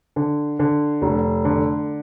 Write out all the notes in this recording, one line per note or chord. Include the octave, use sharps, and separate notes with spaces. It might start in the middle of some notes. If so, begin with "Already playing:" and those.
D3
D3
F1
D3